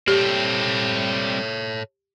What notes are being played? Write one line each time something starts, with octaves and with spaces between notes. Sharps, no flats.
G3 C4 G4 A4 C#5